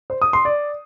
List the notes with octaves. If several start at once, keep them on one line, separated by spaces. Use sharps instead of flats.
C5
D#6
C6
D5